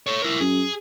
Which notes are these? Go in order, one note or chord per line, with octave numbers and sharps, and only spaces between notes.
A4 C#5
E4 A#4
F#2 G#4